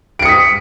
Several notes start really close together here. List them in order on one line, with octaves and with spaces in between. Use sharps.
D7 C#7 D#6 B6